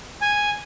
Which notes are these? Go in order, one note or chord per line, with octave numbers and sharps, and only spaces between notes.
G#5